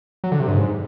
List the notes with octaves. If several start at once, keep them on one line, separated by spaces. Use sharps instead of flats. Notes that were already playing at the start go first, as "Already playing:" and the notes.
F#3
D3
C3
G2
G#2